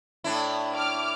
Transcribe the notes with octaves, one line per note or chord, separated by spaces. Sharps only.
A2 D4 E4
D6 F6